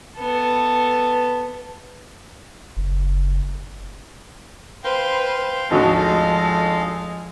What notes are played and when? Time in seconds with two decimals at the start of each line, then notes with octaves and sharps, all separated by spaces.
0.18 B3 A4
2.77 F#1
4.84 B4 C5 F5 G5 C6
5.71 G#1 D2 F3 G#3 F#4 A4 D#5 F5